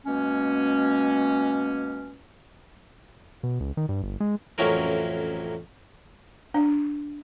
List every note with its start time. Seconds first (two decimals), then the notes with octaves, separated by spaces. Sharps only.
0.06 B2 G#3 A#3 C#4
3.43 B2
3.60 C#2
3.77 D#3
3.89 G2
4.03 G1
4.20 G#3
4.58 A1 F2 F#3 C#4 E4 A#4
6.54 D4